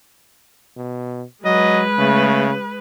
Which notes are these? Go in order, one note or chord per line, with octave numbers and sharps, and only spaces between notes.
B2
F#3 G#3 B4 D#5
C#3 A3